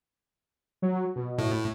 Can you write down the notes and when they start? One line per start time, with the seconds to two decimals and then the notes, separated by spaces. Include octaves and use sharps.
0.82 F#3
1.16 B2
1.38 A2